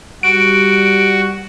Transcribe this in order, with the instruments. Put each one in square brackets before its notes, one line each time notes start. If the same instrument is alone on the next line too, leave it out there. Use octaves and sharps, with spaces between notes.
[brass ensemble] G3 [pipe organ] F#4 [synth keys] D7